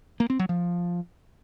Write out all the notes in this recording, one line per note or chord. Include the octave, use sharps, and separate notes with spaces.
A#3
C4
F#3
F3